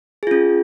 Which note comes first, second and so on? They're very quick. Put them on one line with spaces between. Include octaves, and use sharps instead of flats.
G#4 F4 C#4